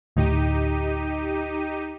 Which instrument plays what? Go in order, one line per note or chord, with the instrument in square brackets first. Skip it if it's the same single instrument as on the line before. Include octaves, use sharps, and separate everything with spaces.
[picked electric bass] D2 A2 [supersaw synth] D#4 G4 D#7